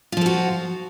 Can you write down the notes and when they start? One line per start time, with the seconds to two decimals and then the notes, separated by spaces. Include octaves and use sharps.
0.12 F4
0.17 F3
0.21 A4
0.26 F#4